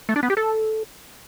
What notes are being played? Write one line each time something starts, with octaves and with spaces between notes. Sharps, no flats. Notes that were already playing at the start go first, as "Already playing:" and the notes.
A3
D4
B3
G4
A4